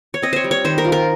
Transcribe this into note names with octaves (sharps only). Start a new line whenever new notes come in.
C#5
C4 D#5
C5 C#5
G3
C#5
D#3 C5
A#4
F4
A#4